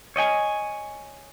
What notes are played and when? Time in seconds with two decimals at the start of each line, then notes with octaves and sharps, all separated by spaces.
0.16 C#5 D#5 G5 G#5